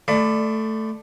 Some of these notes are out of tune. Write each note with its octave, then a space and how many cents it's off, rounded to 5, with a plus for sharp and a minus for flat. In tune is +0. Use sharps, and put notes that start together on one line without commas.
A3 +0 D5 +15 B5 +30